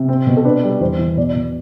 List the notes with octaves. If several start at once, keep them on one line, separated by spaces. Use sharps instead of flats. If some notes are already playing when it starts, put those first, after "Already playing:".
Already playing: C3
C4
B2
A4
D4 B4
G3
E2 C5
E3
B2 D5
B2